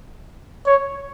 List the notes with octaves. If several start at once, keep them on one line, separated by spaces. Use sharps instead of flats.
C#5